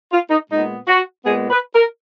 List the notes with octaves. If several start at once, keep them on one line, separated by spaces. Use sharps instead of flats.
F4
D#4
A#2 G#3 B3 D#4
F#4
A#2 G#3 B3 G#4
B4
A#4